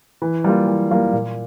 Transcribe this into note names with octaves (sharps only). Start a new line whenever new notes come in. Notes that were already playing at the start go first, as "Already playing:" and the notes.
E3
G3 A#3 F4
E3
G3 A#3 F4
A#2